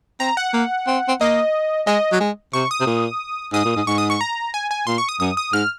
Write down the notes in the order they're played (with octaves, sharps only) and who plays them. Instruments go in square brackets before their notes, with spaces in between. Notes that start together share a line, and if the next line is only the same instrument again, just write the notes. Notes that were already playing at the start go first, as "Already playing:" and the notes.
[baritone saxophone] C4 [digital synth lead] A#5
[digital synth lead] F#5
[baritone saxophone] A#3
C4
C4
[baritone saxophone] A#3 [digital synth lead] D#5
[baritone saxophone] G#3 [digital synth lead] D#5
[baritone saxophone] F#3
G#3
[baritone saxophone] C3 [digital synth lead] C#6
[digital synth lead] D#6
[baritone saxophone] C3
A#2
[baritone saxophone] G#2 [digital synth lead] D#6
[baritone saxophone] A#2
G#2
[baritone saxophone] G#2 [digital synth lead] C#6
[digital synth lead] D#6
C#6
A#5
G#5
G#5
[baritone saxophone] A#2 [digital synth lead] C6
[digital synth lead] C#6
D#6
[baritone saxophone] F#2 [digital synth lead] D#6
[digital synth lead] D#6
[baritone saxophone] G#2 [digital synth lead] F6